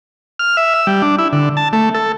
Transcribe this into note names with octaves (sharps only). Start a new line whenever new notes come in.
F6
E5
E6
G3
D4
E4
D3
A5
A3
A4